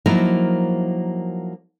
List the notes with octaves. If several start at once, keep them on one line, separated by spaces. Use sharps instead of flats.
F3 F#3 A#3 D#4 E4 A#4